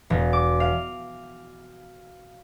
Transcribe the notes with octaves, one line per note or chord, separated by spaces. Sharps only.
E1
D6
F5